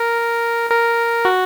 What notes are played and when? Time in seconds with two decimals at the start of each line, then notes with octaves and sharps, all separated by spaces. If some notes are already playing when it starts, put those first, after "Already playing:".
Already playing: A#4
0.70 A#4
1.25 F#4